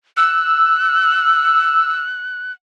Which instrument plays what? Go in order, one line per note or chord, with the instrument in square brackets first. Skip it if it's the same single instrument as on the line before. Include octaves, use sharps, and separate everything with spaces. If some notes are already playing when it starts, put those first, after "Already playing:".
[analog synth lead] E6 [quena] F#6